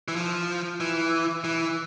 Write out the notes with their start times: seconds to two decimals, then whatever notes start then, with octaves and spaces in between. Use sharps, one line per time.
0.08 E3
0.16 F3
0.80 E3
1.44 E3